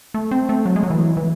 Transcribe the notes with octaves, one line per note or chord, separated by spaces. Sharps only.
A3
C4
A3
F#3
G#3
F#3
E3
E3